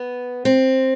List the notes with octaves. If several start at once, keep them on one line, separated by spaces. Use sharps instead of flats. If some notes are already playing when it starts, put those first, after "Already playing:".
Already playing: B3
C4